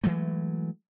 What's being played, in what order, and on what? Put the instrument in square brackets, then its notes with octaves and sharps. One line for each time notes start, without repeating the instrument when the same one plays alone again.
[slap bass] E3 F#3 G#3 A3